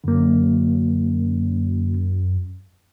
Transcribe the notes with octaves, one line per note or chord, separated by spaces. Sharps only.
F#2 D3 A#3